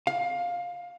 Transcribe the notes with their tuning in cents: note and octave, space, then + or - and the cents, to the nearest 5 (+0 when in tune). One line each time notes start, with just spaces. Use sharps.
F5 +15